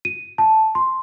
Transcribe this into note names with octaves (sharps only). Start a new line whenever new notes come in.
D#7
A5
C6